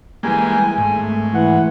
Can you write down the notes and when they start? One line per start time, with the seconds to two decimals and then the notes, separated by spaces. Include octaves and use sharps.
0.23 E3 G3 G#3 A#3 G#5
0.78 G#1 G#2 A3
1.34 E3 F#5